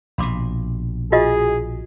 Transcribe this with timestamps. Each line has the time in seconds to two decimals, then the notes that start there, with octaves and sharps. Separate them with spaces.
0.18 A#1 B2 B5 C6 D6
1.12 F4 F#4 G#4 D#5